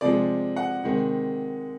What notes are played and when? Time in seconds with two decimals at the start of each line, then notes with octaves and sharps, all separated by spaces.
0.01 C3 F3 G#3 D5
0.56 F#5
0.84 C3 D#3 G#3